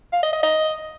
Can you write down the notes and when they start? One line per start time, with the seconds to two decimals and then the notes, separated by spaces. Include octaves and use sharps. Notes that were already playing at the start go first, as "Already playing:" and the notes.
0.13 F5
0.23 D#5
0.33 D#5
0.43 D#5